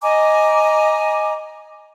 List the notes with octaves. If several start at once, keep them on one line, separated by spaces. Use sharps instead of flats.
D#5 G#5 A#5 D6